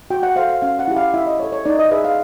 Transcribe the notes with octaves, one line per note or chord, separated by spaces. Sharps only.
F#4 G5
F#5
A4 C5 F5
F5
C#4 F5
F#5
E4 G4
F5
E4 E5
D#5
A4 C#5
C#5
D#4 D5
D#5
G#4 B4 E5
F5